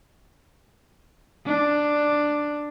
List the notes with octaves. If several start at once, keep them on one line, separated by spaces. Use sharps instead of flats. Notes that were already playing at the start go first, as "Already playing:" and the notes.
D4